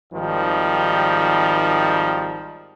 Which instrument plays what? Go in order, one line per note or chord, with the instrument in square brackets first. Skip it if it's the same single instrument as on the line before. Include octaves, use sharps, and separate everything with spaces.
[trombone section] G#1 D#3 F3 G3